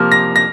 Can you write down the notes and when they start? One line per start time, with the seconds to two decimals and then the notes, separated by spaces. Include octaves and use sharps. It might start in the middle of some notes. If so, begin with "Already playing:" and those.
Already playing: C3 F3 A#3 F6
0.12 A#6
0.36 A#6